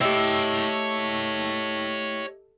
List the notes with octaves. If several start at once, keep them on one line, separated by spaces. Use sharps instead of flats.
A3 G4 C#5 D#5 G5 E6